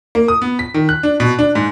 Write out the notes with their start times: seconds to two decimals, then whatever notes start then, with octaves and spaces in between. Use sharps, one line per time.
0.15 A#3
0.28 D#6
0.42 B3
0.59 B6
0.74 D#3
0.89 F#6
1.03 D4
1.20 B2
1.39 D4
1.55 G#2